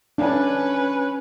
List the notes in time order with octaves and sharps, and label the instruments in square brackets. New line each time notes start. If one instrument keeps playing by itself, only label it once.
[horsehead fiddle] C#4 B4 [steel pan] D4